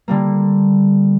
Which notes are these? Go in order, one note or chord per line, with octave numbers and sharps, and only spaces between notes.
D3 G3 A#3